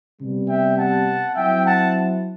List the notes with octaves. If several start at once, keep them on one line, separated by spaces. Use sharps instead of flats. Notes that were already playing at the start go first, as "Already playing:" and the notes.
C3 G3 B3
E5 G5
F#5 A5
F#3 C4 E4 E5 G5
F#5 A5